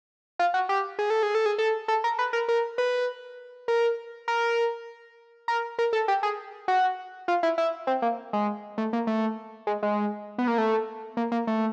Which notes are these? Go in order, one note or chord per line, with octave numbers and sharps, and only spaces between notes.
F4
F#4
G4
G#4
A4
G#4
A4
G#4
A4
A4
A#4
B4
A#4
A#4
B4
A#4
A#4
A#4
A#4
A4
G4
G#4
F#4
F4
E4
E4
C4
A#3
G#3
A3
A#3
A3
G#3
G#3
B3
A#3
A3
A#3
A#3
A3